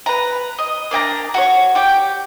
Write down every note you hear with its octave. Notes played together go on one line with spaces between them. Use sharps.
B4 A#5
D#5
A#3 D4 G5 A#5
F#4 A4 C#5
G4 G5